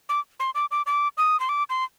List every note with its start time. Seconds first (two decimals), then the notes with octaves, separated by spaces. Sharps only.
0.09 D6
0.40 C6
0.55 D6
0.71 D6
0.86 D6
1.18 D#6
1.40 C6
1.49 D6
1.70 C6